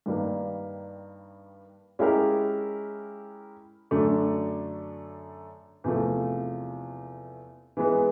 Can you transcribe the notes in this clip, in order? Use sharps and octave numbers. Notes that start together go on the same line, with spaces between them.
G2 D#3 G3 A#3
G#3 C#4 E4 G4 A#4
F#2 D3 F#3 A3 D4
E2 C3 F3 A3
E3 G#3 B3